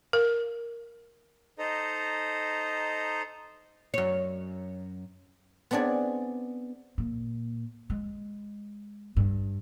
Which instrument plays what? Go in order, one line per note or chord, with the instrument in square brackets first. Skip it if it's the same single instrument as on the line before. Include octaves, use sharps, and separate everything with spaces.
[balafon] A#4
[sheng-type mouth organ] D#4 A4 C5 D#5 A#5
[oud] F#2 C#5
[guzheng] B3 C4 D4 G#4 D5
[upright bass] A#2
G#3
G2